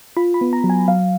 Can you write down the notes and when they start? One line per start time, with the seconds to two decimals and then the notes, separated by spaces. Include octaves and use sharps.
0.17 F4 B5
0.34 B5
0.41 B3
0.53 A#5
0.64 F#3
0.69 G#5
0.88 F#3 F5